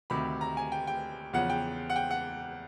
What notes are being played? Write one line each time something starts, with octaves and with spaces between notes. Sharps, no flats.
D2 C3 D#3 B5
A#5
G#5
G5
G5
E2 C#3 F3 F#5
G5
F#5
G5
F#5